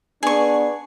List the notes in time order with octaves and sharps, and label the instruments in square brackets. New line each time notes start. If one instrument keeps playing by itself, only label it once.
[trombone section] B3 D4 [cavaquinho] G#4 C#6